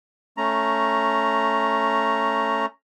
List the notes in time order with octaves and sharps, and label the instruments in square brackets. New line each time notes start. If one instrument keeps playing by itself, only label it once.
[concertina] A3 C#4 A#5